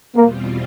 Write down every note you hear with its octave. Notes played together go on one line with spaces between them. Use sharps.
E2 B2 G3 A#3 C4 F4